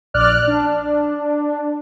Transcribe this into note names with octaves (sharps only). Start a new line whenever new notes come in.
A#1 D5 F6 F#6
D4